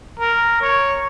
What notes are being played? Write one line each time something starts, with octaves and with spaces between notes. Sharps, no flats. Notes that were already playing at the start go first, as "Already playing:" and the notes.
A#4
C#5